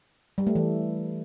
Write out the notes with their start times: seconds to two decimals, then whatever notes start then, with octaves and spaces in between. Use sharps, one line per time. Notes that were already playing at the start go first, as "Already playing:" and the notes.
0.38 G3
0.47 A3
0.55 E3